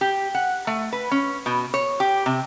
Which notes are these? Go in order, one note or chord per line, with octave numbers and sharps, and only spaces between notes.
G4
F#5
A3
B4
C#4
B2
C#5
G4
C3